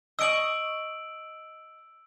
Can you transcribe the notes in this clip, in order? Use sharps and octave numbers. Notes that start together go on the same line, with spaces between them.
D#5 C#6 E6 D7 F#7